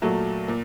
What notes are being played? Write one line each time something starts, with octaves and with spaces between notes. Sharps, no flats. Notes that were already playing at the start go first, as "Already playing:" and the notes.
A#2 F#3 A3
A#2